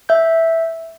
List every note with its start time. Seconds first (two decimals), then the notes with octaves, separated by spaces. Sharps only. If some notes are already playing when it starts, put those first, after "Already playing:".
0.09 E5 G6